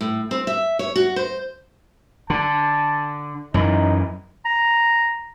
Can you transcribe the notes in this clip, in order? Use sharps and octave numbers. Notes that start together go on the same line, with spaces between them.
A2
C4
E5
C#5
F#4
C5
D3 A5
F#2 E3 D#4
A#5